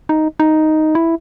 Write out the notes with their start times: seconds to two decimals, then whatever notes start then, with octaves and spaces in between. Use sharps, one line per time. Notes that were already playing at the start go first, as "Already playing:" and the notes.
0.09 D#4
0.40 D#4
0.95 E4